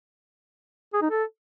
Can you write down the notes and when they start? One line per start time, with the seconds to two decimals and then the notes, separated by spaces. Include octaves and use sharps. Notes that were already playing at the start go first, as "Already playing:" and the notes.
0.94 G#4
1.02 D#4
1.11 A4